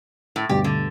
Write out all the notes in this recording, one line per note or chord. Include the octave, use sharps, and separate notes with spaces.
A2
D2 G2 B2 G4
D3